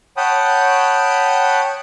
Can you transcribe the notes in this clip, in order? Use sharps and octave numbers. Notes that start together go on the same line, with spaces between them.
C#5 F#5 G5 A5 B5 D#6